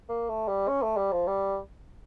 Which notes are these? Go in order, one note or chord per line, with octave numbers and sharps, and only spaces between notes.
A#3
A3
G3
C#4
A3
G3
F3
G3